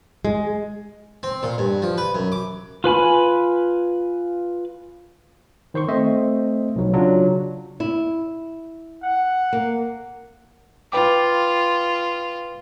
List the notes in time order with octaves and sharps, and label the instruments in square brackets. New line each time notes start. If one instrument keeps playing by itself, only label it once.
[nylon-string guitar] G#3
[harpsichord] C4
A#2
G2
F3
B4
F#2
D6
[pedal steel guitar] F4 B4 G#5 B5
[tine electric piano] D#3 C5 C6 C#6
A3 C4 C5 D#5 E5
B1 F#3
C#3 F#3 D4 F4
[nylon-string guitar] E4
[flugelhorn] F#5
[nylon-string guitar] A#3
[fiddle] F4 [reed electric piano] B4 G5 D6